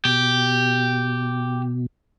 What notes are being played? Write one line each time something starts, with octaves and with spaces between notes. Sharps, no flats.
B2 G4